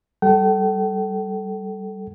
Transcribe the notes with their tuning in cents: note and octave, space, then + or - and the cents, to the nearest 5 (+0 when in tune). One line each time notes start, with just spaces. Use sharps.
G3 -10 A4 -5 G5 -45